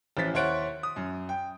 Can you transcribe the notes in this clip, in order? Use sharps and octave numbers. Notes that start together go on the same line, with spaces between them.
A1 E3 F3 A6 B6
D#2 E4 C5 C#5 F#5 D7
D#6
F#2
G5